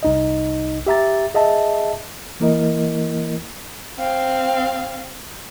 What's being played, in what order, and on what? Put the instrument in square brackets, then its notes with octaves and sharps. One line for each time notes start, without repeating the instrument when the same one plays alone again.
[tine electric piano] C2 D#4 D#5
G4 E5 A#5 A6
G#4 D#5 E5 A5
[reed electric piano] E3 A#3 E4 A#4 D#5
[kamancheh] C4 F5